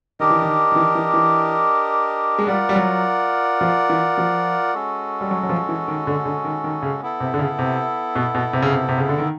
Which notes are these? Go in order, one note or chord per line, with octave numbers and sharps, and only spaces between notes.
D#3 D4 G4 A#4 D#5
E3
D#3
D#3
E3
E3
E3
G#3
G3 F4 A#4 D5 F#5
G3
F#3
F3
E3
F3
G#3 C#4 F#4 A4
G3
F#3
F#3
F3
E3
D#3
D3
D3
D#3
D#3
C#3
B3 E4 A4
C3
D3
C#3
C3
B2
B2
C3
C#3
C3
C3
C#3
D3
D#3